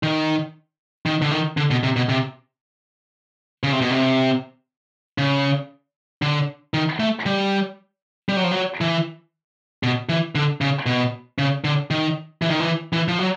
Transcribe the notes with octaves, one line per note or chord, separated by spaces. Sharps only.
D#3
D#3
D3
D#3
D3
B2
C3
B2
C3
C#3
C3
B2
C3
C#3
D3
D#3
A3
G3
G3
F#3
F3
F#3
E3
B2
E3
D3
C#3
B2
C#3
D3
D#3
E3
D#3
E3
E3
F3
F#3